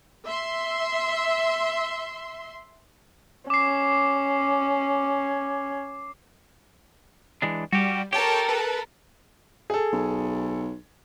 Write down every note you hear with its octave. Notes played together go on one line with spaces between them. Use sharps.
E5 C6
C#4 D6 C7
E3 G#3 D4
G3 F#4 G4
G4 A4 A#4 C#5 G5 A5
B4
G#4 A4
B1